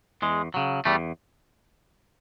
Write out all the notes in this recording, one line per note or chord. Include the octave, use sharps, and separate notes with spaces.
E2 G#3
C#3 F#3
E2 G3 A3